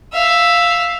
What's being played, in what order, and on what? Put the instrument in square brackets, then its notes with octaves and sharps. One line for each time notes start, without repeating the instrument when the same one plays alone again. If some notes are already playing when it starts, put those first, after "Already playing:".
[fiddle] E5 F5